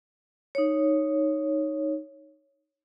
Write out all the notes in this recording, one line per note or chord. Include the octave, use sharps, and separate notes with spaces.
D#4 C#5